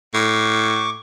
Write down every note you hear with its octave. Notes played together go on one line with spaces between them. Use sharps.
A2 C#6 D6